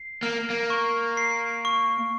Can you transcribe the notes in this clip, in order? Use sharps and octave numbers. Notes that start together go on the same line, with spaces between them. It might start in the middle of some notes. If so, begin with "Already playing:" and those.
Already playing: C7
A#3 F6
A#3
C#6
C7
C#6